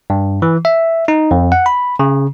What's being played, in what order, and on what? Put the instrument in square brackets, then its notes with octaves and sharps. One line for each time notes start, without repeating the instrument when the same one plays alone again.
[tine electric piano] G2
E3
E5
D#4
F2
F#5
B5
C#3